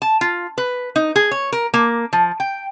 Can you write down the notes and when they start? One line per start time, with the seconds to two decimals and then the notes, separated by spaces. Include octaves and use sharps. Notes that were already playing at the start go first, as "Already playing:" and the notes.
0.02 A5
0.21 F4
0.58 B4
0.96 D#4
1.16 G#4
1.31 C#5
1.52 A#4
1.74 A#3
2.13 F3
2.40 G5